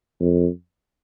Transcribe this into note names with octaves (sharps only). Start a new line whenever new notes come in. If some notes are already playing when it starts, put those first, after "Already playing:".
F2